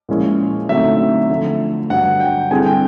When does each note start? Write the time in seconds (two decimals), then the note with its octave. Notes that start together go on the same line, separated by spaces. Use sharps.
0.09 A#2 F3 G#3 C#4 E4
0.69 D3 F#3 A3 C4 D#4 E5
1.30 D3 F3 A3
1.90 G2 D3 F#3 F#5
2.20 G5
2.51 D3 G3 C4 E4 G#4 G#5
2.66 G5